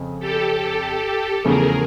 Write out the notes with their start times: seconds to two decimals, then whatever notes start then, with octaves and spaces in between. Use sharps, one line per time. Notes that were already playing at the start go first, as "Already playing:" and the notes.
Already playing: F2 C#3
0.20 G4 A4
1.44 E2 C#3 F3 A3 G#4 A#4